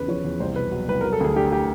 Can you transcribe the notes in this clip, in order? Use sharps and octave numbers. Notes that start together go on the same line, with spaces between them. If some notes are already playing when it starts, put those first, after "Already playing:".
Already playing: E2 C#3 B4
F3 C#5
E2
C2 C5
B2 B4
F#3
C2 B4
F#3 A#4
A4
D2 G#4
D3 G4
G4